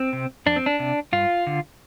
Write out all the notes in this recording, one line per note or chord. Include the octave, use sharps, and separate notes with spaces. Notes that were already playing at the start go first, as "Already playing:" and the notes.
Already playing: C4
C3
F2 D4
C4
D4
C3
G2 F4
D3